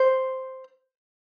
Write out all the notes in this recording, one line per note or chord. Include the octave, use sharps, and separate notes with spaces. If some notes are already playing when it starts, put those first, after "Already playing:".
Already playing: C5